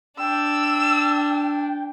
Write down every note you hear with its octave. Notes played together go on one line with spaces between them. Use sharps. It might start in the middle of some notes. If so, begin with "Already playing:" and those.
D4 G5 E6